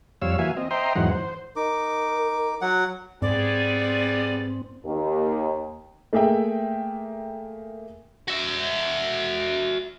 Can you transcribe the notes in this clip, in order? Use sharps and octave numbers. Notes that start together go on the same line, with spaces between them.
F2 G3 C#5 F5 E6
E3 A#3 F#4 E5 F5 G#5
C4 D#5
C5 D#5 E5 G5 A#5 C6
E2 G#2 E3 F#3 D#4 F#5
C5
D#4 A#4 D6
F#3 F#5
G#2 G3 B3 C4 G#4 D5
D#2
A3 A#3 G#4 E5 G5
F#4 E5